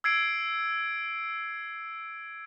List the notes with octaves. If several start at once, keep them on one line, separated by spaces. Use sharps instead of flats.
E6 G#6 C7 D7